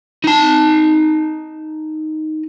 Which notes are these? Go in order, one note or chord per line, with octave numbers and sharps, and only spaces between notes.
D#4 A5